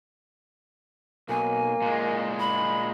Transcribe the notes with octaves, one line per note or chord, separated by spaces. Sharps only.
B1 A#3 G#5
A#2 G#3
B5